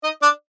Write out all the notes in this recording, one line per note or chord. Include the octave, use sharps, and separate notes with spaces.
D#4 D#5
D4 D5